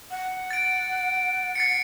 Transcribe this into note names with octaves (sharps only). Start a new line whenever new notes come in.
F#5
A6 D7
A6 C7 C#7